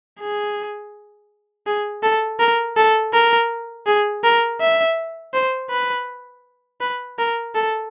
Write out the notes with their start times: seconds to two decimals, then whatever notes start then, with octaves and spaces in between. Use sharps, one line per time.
0.20 G#4
1.67 G#4
2.03 A4
2.40 A#4
2.76 A4
3.13 A#4
3.87 G#4
4.24 A#4
4.61 E5
5.34 C5
5.71 B4
6.81 B4
7.19 A#4
7.55 A4